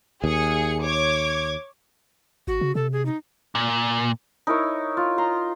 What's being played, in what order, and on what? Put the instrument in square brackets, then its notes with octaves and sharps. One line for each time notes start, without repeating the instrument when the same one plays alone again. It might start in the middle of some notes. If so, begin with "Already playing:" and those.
[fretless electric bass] D#2 [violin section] G#4 C#7
[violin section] C#5 D6 G#6
[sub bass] G#1 [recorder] F#4
[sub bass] C#3
[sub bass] C3 [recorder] A4
[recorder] G#4
D#4
[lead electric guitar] A#2
[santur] D#4 E4 A#4 C#5
F4
A#5 C6